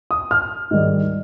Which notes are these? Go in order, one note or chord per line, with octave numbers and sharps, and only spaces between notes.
D#6
F6
G#2 D#3 G3